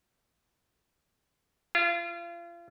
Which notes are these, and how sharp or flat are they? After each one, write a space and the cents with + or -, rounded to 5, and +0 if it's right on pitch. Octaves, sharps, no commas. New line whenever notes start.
F4 -35